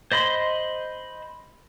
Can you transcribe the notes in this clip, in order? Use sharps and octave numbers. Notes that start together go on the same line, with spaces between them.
C5 D#5 B5 C6